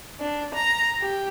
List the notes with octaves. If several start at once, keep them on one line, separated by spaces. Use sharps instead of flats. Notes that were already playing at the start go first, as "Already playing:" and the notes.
D4
A#5
G4